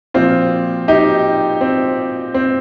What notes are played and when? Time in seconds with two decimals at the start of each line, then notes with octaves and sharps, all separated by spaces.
0.14 A#2 F3 C4 F4
0.88 D#4 G4
1.61 C4
2.34 C4